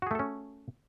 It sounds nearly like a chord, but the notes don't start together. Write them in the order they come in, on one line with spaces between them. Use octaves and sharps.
F#4 G#4 A3 A4 C#4